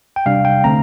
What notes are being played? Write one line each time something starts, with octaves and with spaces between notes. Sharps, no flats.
G5
C3 G3 D4 F5
G5
D3 A3 C4 A#5